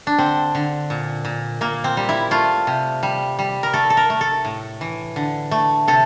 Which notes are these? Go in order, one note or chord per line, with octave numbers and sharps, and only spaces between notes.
D4
D3 C4
D3
A#2
A#2
A#2 A#3
C4
G3
E4
A3 F4
C3
G3
G3
A#4
A3 A4
A4
A#4
A3
A4
A2
E3
D3
A3
C3 A4